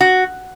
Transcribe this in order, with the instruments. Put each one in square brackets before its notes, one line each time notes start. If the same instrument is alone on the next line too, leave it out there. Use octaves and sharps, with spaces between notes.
[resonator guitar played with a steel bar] F#4